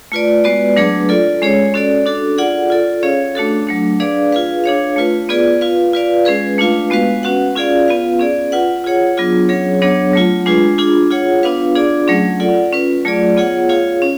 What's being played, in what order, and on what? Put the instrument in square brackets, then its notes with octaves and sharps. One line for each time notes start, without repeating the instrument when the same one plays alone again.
[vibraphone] A3 F4 B4 D5
G#3 B3 F#4 B4 D5
F#3 A3 D4 G#4 B4
F4 A4 D5
G#3 C#4 G#4 C#5
C#4 F#4 A4 D5
D4 F#4 A4
F4 G#4 D5 F#5
F4 A4 D5
C#4 G#4 C#5 F5
A3 D4 F#4 A4
F#3 A3 D4
D4 G#4 B4 D5 F5
F4 G#4 B4 F5
D4 G#4 C#5 F5
A3 F4 B4
B3 F4 G#4 B4 D5
F4 B4 F5
F4 B4 D5 F5
G#3 C#4 G#4 B4
A3 D4 F4 B4 F5
G#3 B3 F#4 B4 F5
C#4 F#4 B4 F#5
C#4 F4 G#4 D5 F5
B3 F4 B4 F5
C#4 G#4 D5
F4 B4 F#5
F4 G#4 C#5 F#5
F#3 B3 D4 F4 G#4
F#3 C#4 G#4 C#5
F#3 B3 D4 G#4 C#5
F#3 A3 F4
G#3 D4 F4 G#4 B4
D4 F4 G#4
F4 G#4 C#5 F#5
B3 D4 F4 B4 F5
D4 F4 G#4 D5
F#3 A3 C#4 G#4
F4 A4 D5 F#5
C#4 F4 B4
F#3 A3 F4 G#4 D5
B3 F4 G#4 C#5 F#5
F4 G#4 C#5 F5
C#4